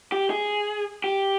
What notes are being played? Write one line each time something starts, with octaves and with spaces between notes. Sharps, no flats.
G4
G#4
G4